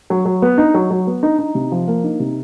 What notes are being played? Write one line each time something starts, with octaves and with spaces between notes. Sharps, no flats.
F#3
F#3
B3
D#4
F#3
F#3
B3
D#4
D#4
C3
F3
A#3
D#4
C3